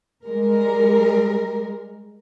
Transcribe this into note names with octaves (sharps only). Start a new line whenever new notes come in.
G3 G#3 A#4